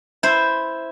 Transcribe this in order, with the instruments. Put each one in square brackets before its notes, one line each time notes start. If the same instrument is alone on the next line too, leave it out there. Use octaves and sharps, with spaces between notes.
[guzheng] E4 C5